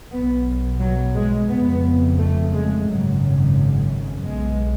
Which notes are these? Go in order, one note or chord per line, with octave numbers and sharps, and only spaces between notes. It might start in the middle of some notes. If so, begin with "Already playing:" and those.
B1 B2 B3
F#3
G#3
F1 F2 C#3 B3
A3
G#3
G#1 F#2 C#3 F#3
B1 B2 G#3